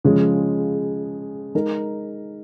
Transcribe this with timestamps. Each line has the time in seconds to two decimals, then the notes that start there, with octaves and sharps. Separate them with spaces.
0.05 C#3 F3 G#3
1.55 G#3 D#4 A#4